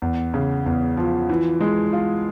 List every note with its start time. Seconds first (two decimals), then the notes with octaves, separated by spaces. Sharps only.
0.02 E2
0.34 C#3
0.66 E2
0.97 F3
1.30 E3
1.61 G#3
1.93 F4